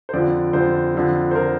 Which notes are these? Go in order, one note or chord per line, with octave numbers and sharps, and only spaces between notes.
C5
F2 D3 F3 D5
F2 D3 F3 C5
F2 D3 F3
C5
D3 F3 A#4